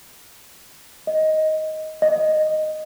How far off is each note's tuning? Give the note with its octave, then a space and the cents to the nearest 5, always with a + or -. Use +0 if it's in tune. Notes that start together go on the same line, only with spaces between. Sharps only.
D#5 +10
D#5 -5